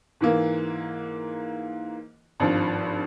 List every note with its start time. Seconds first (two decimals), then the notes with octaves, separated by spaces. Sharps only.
0.21 G#2 E3 A#3
2.40 G#1 G2 F3